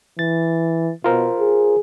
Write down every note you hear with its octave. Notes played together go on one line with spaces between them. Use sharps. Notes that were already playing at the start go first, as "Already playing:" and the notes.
E3 A6
B2 F4 A#4 C5
G#4